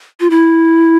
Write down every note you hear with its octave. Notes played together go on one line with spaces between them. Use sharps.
F4
E4